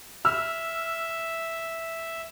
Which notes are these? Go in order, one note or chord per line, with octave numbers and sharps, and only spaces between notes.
E5 E6 F6